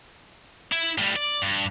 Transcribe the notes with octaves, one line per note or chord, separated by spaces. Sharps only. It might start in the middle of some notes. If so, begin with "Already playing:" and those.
E4
A2 G3
D5
G2